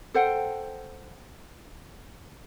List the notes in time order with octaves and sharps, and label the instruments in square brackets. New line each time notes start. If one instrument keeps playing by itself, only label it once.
[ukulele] A4 C5 F#5 G5